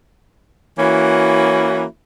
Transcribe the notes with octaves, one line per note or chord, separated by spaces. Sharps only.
E3 A#3 C#4 E4 F#4